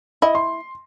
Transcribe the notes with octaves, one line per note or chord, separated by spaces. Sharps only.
E4 D#5
C6